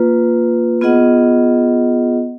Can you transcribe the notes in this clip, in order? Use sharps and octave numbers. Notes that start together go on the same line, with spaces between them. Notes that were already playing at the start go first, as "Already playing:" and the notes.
Already playing: A#3 F4 B4
B3 F4 G#4 D#5 F#5